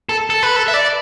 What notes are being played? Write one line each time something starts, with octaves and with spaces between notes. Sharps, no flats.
A4
A4
B4
A4
E5
D5